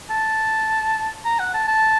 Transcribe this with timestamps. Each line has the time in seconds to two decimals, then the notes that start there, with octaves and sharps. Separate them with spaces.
0.10 A5
1.25 A#5
1.39 F#5
1.54 A5
1.67 A5